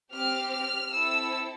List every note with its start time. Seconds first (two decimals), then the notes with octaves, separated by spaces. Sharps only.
0.14 C4 G4 F6
0.52 F6
0.93 C4 E4 A4 E6